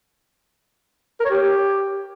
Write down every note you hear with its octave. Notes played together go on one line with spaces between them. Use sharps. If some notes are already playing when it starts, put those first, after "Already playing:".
A#4
C#5
G4